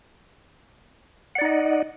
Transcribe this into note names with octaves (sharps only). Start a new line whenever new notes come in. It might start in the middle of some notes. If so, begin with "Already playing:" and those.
D#4 D5 D#5 F#5